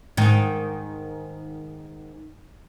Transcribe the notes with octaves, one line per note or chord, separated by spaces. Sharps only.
G#2 D#3